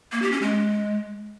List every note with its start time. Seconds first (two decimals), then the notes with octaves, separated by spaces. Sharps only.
0.12 A#3
0.22 G4
0.32 C#4
0.42 G#3